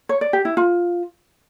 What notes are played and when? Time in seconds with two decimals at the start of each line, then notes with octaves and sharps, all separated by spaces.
0.09 C#5
0.21 D5
0.33 G4
0.45 E4
0.57 F4